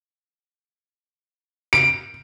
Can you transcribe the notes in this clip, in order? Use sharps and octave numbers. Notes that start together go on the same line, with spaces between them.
D7